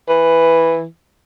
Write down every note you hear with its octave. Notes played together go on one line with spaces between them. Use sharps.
E3